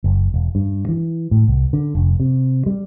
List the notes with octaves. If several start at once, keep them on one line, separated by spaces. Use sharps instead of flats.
F#1
E1
G2
E3
A2
C2
D3
F1
C3
G3